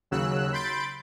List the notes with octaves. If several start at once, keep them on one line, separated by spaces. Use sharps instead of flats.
D#2 C#3 F#3 E6 F#6
B5 C6 G6 A6 D7